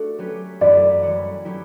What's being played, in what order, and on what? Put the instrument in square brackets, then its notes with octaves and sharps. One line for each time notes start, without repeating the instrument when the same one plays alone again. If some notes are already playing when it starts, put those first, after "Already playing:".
Already playing: [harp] A3 D4 F#4 A4
F#3 C#4 G4 B4
[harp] F#2 E3 A3 E4 B4 [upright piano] D5
[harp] E3 G3 C#4 F#4
F#3 C#4 E4 G4